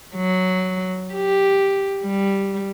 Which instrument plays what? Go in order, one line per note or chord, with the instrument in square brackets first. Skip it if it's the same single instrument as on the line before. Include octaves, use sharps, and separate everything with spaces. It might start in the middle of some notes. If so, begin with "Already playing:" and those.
[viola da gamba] F#3
G4
G3